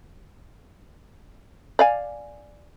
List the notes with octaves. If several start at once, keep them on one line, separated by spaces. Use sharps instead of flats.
D5 F5 G#5